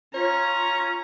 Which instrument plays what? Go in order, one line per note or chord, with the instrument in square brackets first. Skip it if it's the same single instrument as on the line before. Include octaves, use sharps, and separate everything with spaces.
[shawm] C#4 [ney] F4 [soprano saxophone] C#5 [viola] A#5